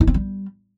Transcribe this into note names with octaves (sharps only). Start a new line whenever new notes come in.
D#4
C4
G3